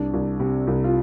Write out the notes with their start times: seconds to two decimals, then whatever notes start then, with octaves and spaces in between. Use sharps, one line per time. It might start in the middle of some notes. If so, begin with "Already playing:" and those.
Already playing: C2 D4
0.13 C2
0.40 C3
0.67 C2
0.84 F4